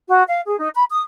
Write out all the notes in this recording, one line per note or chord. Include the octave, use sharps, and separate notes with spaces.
F#4
F5
G#4
D#4
B5
D#6